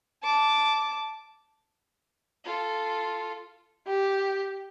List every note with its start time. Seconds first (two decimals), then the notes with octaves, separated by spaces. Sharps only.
0.23 A5 D6
2.44 F4 A4
3.87 G4